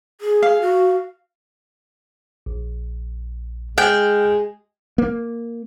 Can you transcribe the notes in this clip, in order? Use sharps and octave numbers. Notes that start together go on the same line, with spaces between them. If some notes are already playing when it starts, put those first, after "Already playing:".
G#4
F5
F#4
A#1
G#3 G#4 G5 F6 F#6
A#3